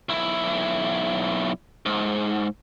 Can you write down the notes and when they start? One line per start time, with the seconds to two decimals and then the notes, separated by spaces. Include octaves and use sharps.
0.09 B1 E4
1.86 G#2